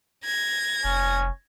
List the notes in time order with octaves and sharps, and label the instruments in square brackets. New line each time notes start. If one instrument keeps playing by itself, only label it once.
[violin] G#6 A#6
[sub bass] F1 [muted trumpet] C#4